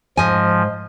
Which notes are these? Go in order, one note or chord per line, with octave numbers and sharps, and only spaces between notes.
G#2 F3 D#5 G#5